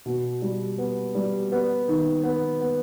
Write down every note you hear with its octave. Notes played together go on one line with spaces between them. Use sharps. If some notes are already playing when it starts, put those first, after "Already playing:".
B2
G3
B3
G3
B3
D#3
B3
B3